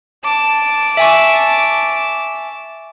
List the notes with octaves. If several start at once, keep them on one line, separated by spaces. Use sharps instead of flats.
A5 D6
E5 G#5 C#6